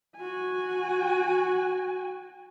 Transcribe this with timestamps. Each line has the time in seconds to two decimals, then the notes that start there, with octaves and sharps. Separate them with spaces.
0.16 F#4 G#5